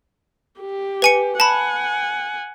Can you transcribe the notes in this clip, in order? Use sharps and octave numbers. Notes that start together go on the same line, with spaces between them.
G4
B4 G#5 C#7
F#5 G#5 A5 B5